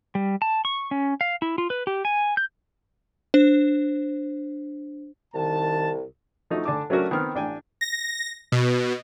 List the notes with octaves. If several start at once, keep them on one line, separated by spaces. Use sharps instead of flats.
G3
A5
C#6
C#4
F5
E4
F4
B4
G4
G#5
G6
D4 C5
C2 D#3 A5
F3 A3 D#4 F#4
D3 D4 G#5 A5 D6
F#3 A3 C#4 D4 F#4 A#4
D#3 B3 C4 F6
A1 D4 G5 G#5
A#6
B2